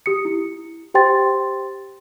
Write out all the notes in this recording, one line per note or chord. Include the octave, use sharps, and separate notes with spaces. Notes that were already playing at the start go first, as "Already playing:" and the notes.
G4 D#6 C#7
E4
G4 C5 G5 C6 A6